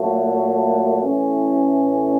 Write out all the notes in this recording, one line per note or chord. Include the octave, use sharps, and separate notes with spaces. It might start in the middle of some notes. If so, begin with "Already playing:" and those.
Already playing: A#2 F#3 A3
A1 A2 E3 A3 C#4